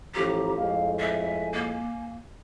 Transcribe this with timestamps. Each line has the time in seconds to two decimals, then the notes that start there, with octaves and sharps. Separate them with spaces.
0.14 A1 A2 F3 G4 A#5
0.56 F2 A2 G#3 F5
0.99 E5 G#5
1.53 A#3